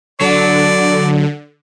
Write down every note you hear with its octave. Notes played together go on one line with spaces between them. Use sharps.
D3 F#3 D5